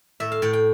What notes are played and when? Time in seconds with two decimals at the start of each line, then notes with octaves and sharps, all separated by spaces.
0.20 A2 E5
0.32 F5
0.42 A2 G5
0.53 G5